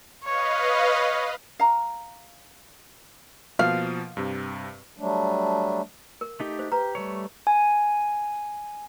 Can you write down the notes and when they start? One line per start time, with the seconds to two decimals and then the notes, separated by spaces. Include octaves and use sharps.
0.24 B4 C#5 D#5 F5
1.59 F5 A#5
3.59 B2 F3 A#3 F5
4.17 G2 C3
4.97 F#3 G3 A3 D4
6.21 A#4
6.40 A3 D#4 G4
6.59 C5
6.72 G4 B4 A#5
6.95 G3 A3 C#5
7.47 G#5